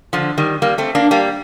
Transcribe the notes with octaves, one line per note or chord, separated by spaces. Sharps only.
D3 F3
D#3 G3
G3 A#3
A3 C4
A#3 D4
G3 A#3